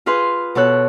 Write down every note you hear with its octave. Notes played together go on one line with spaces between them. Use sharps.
F4 G#4 B4 F5 C6
B2 B3 A4 C#5 F#6